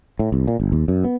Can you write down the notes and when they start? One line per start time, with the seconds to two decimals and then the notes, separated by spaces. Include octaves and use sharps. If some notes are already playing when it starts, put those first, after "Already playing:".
0.19 A2
0.32 C2
0.47 A#2
0.60 G1
0.72 D#2
0.88 F#2
1.04 B3